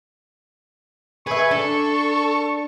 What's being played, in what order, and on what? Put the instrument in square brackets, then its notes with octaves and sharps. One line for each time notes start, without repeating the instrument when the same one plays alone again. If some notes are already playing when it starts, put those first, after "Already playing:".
[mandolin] G#4 E5 [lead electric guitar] B4 [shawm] C#6
[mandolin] D4 [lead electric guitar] A4